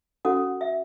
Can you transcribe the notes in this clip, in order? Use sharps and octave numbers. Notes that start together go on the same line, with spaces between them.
C#4 F#4 A4 F#5
E5